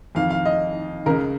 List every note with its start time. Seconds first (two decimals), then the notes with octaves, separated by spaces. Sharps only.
0.15 F2 D#3 F5
0.30 F5
0.45 D#5
1.06 C#2 C#3 A#4